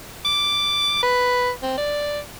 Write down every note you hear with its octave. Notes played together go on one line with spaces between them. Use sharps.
D6
B4
C4
D5